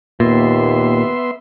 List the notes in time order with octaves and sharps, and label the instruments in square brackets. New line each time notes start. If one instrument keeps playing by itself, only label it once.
[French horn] D#2 [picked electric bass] A#2 [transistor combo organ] B3 E5 C6